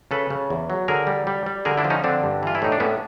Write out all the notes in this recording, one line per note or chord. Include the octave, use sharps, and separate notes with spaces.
C#3 A4 B4
C#3
E2
F#3
D3 G#4 A#4
G3
G3
G3
D3 G#4 A#4
D4 E4
F3
C#4 D#4
D3 C4 D4
G2
E3 F4
E4
A2 D#4
D4
A2 B3 C#4